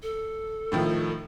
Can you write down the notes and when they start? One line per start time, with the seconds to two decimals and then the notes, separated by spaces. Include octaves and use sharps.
0.02 A4
0.72 A2 D#3 F3